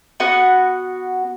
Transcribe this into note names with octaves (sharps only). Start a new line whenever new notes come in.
B3 F#4 F#5